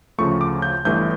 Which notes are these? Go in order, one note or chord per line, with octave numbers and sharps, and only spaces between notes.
D2 C#3 F3 A3 C#6
D6
G6
G1 G2 E3 A3 G6